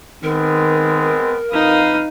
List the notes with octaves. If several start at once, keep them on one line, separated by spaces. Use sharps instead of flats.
D#3 G#3 B3 C4 A#4
F2 D#4 B4 F5 D#6